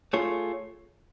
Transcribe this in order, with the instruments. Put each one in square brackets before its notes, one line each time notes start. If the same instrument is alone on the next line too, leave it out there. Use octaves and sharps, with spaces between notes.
[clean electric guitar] A3 F4 G#4 C#5